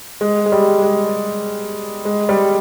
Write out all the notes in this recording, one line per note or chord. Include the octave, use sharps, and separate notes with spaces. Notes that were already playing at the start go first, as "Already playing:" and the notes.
G#3
G#3
G3
G#3
G#3
G3